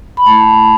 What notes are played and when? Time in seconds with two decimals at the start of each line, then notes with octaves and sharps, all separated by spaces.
0.17 B5
0.26 A3 E4 A5